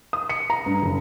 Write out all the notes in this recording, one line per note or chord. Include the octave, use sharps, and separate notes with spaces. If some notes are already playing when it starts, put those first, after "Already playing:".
D#6
C#7
A#5
G2
F#1